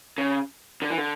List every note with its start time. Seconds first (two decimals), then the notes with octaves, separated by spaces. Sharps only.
0.18 C#3
0.82 D3
0.90 E3
0.98 D3